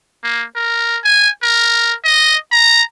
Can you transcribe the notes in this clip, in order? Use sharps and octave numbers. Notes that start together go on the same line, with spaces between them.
A#3
A#4
G#5
A#4
D#5
A#5